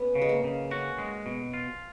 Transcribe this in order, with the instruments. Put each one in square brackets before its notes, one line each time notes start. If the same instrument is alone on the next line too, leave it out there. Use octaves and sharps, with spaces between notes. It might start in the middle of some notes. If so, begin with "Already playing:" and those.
Already playing: [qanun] B3 C#4
[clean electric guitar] C#3
[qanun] G#3
A#3
[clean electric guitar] C#3
[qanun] C#4 [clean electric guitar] F#4
[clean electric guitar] G#3
B2
F4